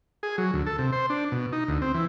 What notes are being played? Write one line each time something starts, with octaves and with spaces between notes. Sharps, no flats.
G#4
F#3
D2
A4
C3
C5
D4
B2
D#4
D2
C4
E3